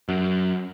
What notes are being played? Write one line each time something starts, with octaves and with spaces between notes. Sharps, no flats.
F#2